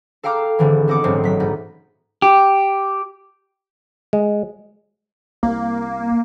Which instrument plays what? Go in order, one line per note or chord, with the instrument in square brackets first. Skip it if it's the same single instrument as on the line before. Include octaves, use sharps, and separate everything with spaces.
[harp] A4 F5 G5 A#5 D6 F6
G#1 D3 E3
B3 C4 A4 D#5 F#5 D6
D#1 A1 G#2 F#3 C4 C7
F#3 B6
G#2 B3 D#4
[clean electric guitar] G4
[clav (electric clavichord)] G#3
[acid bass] C2 [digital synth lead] A#3